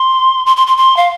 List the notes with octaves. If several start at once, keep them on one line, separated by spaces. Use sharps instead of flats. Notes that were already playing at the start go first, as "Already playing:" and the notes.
Already playing: C6
C6
C6
C6
C6
F5